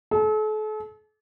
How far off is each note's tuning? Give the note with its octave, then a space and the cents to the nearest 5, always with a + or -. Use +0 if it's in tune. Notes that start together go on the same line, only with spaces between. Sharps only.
A4 -40